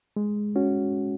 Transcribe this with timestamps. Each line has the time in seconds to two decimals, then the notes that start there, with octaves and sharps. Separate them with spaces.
0.16 G#3
0.56 C#4 F#4